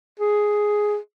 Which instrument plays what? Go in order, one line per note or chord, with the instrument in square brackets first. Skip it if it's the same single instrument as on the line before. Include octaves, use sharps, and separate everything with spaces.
[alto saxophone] G#4